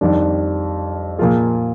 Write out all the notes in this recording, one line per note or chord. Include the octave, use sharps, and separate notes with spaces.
F2 D#3 G3 D4
A#2 F3 A#3 F4 G#4